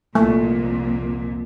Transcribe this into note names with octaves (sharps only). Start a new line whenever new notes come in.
C2 F2 A#2 A3